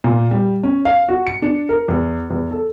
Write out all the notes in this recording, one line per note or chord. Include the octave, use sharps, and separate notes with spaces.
A#2
G3
C#4
F5
F#4
C#7
D4
A#4
E2
E2
A4